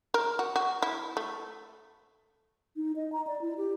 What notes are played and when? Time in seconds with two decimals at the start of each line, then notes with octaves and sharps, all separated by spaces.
0.14 A#4
0.39 F#4
0.56 F#4
0.82 E4
1.17 A3
2.76 D#4
2.96 D#5
3.12 A#5
3.27 D5
3.42 E4
3.58 G4